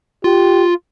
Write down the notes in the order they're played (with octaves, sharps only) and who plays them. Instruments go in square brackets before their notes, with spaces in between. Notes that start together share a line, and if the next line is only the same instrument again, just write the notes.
[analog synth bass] F4 [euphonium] G4